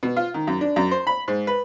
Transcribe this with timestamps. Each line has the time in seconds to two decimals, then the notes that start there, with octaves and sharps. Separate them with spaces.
0.03 B2
0.16 F4
0.34 D#3
0.47 F#2
0.61 D4
0.76 F#2
0.91 C5
1.07 B5
1.28 G#2
1.47 B4